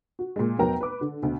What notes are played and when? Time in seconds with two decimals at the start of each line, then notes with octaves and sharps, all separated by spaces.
0.19 F#4
0.36 A#2 G#3
0.59 F1 F#3 B3 A#4 G5 A#5
0.81 B4 D6
1.01 D3
1.22 D2 B2